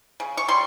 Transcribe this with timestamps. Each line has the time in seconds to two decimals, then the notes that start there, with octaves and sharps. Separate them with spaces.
0.20 C#3
0.37 C#6
0.48 G3 C6